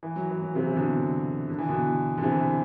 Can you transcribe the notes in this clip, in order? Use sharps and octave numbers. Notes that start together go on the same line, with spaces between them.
E3
F#3
E3
F#3
C3 E3
C3
B2 D3
D3
E3
B2 D3
D3
C3 E3